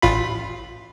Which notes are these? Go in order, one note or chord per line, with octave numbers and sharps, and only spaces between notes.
A1 F4 B5